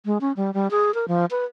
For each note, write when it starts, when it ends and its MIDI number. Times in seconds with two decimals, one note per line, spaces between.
0.06 0.18 56
0.21 0.32 61
0.37 0.51 55
0.54 0.68 55
0.71 0.94 68
0.94 1.08 70
1.08 1.25 53
1.31 1.45 71